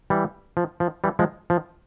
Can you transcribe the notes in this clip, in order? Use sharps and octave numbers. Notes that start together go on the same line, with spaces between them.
E3 G3
F3
F3
E3 G3
F3 G#3
F3